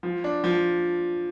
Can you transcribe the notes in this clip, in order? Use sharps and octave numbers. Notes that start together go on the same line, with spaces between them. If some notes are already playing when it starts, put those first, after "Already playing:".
F3
D4
F3